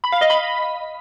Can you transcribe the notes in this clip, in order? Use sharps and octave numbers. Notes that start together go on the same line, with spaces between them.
B5
F5
D#5
B5